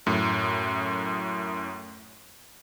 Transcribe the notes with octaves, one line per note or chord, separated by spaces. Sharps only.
F#2 A2